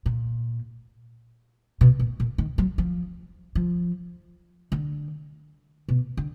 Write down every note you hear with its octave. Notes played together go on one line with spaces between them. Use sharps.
A#2
B2
A#2
A#2
D#3
F#3
F3
F3
D3
B2
D3